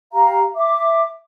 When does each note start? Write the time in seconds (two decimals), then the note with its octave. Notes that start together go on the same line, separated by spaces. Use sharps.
0.13 G4 F5 A#5
0.56 E5 D6